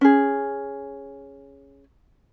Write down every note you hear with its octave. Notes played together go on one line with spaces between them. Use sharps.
C#4 G#4